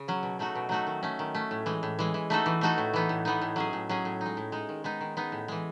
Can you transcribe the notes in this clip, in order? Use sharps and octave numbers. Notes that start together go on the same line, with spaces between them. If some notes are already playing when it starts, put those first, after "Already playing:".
Already playing: C#3
F#3 C#4
B2
F#3 A3 D#4 F#4
B2
F#3 A3 D#4 F#4
D#3
A3 C#4
D#3
A3 C#4
A2
E3 G#3
A2
E3 G#3
E3
A3 D#4 F#4 A4
E3
A3 D#4 F#4 A4
A2
E3 B3 D#4
A2
E3 B3 D#4
A2
F#3 C#4 G#4
A2
F#3 C#4 G#4
A2
G#3 D#4
A2
G#3 D#4
D#3
G#3 B3 D#4
D#3
G#3 B3 D#4
A2
E3 G#3